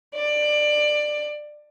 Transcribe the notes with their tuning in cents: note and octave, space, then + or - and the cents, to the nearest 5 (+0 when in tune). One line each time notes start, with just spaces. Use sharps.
D5 +20